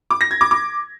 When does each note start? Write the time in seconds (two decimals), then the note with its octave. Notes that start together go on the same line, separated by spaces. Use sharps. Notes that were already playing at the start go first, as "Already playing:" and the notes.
0.11 D6
0.21 A#6
0.31 G#6
0.41 D6
0.51 D6